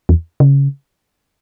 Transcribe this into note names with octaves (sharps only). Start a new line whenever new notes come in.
E2
C#3